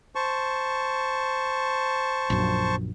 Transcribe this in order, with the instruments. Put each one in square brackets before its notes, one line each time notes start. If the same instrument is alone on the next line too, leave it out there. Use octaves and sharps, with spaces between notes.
[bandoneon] C5 A5 C#6
[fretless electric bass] A#1 F#2